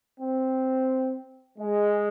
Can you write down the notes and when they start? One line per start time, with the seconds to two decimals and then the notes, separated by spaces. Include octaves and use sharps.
0.21 C4
1.59 G#3